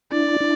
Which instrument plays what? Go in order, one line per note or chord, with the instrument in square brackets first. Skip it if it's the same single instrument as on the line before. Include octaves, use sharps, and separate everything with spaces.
[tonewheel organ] D4 E4 [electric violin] D5
[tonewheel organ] D4 E4